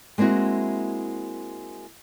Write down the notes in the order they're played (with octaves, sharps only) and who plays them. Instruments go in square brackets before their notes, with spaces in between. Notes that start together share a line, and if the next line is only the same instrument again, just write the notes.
[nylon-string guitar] G#3 A#3 C4 E4 F#4